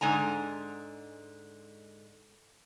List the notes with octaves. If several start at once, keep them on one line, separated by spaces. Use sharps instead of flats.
G#2 D3 G#3 G#5 A#5